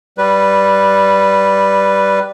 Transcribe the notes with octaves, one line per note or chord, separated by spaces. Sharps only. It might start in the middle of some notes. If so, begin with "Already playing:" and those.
G3 B4